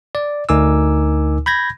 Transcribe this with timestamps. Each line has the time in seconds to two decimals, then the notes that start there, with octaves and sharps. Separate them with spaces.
0.15 D5
0.49 D2 D#4 A#4 G#5 D6 E6
1.46 B5 G6 G#6 A#6